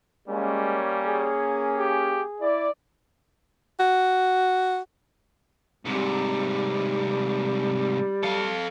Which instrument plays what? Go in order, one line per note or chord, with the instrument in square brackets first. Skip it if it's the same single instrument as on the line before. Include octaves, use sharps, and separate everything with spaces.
[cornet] G3 [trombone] G#3 [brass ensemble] A#3 C#4
[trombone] G#4
[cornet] G4
[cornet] E4 [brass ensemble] D5
[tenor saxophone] F#4
[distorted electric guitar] G#2 C3 [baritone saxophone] G3
[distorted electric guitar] A4 F5